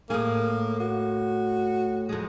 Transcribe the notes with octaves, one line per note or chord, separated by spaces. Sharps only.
A2 A#3 G#4
F#4
F2 G#3